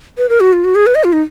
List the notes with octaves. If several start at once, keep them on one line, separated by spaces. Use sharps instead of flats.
B4
A#4
F#4
F4
F#4
G#4
B4
D#5
F4
D#4